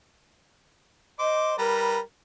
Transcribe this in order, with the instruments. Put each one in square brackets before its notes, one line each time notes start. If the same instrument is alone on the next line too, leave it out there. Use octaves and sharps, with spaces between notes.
[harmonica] C5 D6 [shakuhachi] D#5
[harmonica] G3 B4 A#5 [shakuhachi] A#4